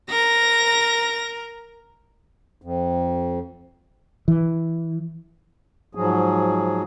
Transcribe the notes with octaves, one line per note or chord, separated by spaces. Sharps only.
A#4 A#6
F2
E3
G#2 F3 F#3 G#4